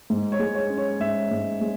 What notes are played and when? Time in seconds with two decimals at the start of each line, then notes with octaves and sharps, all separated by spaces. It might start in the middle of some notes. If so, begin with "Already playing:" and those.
0.10 G#2
0.32 C#5
0.39 G#3
0.54 C#5
0.70 C#4
0.77 C#5
1.00 G#2 E5
1.31 G#2
1.61 G#3